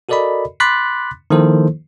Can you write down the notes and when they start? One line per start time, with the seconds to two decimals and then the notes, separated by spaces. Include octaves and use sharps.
0.09 F#4 A4 A#4 D5 D#5 B5
0.60 B5 C6 D6 F#6 A6 B6
1.30 D#3 F3 A#3 E4 A4 C5